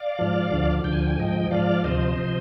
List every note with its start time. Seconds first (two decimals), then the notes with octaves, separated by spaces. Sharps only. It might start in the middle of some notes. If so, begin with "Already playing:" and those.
Already playing: D5 F5
0.19 G#2 F3
0.51 D2 D3 F3
0.84 D2 D3 F3 G5
0.93 G#5
1.03 G5
1.11 G#5
1.18 G#2 F3 D#5 G5
1.50 G#2 F3 D5 F5
1.84 D2 C3 F3 C5 D#5
2.16 C3 F3